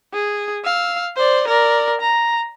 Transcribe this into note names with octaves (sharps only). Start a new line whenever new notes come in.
G#4
F5 E6
C5 D5
A#4 D5
A#5